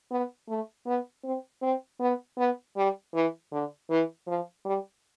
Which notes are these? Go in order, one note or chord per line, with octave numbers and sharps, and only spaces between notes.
B3
A3
B3
C4
C4
B3
B3
G3
E3
D3
E3
F3
G3